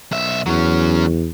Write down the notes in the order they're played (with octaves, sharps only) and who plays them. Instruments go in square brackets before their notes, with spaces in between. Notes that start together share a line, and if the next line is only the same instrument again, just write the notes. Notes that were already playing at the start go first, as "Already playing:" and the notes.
[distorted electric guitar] B1 E5
[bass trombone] E2 [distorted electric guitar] F#3 C#4